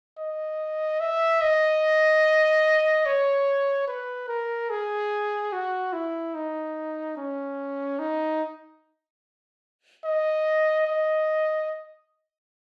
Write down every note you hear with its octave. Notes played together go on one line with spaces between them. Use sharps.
D#5
E5
D#5
C#5
B4
A#4
G#4
F#4
E4
D#4
C#4
D#4
D#5
D#5